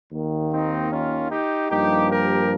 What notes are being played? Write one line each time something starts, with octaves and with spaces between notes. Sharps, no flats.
D#2 D#3 A#3
C4 D#4
C#4 F4
D#4 G4
G2 F3 A#3 D#4 G4
G4 A#4